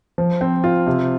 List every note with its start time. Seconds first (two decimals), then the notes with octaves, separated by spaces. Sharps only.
0.18 F3
0.41 C4
0.64 F4
0.87 C3